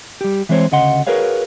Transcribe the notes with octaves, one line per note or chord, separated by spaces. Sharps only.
G3 G4
E3 G#3 C4 C5 C#5
D2 C#3 D#5 F#5 C6
F#4 G#4 A#4 B4 C#5 F5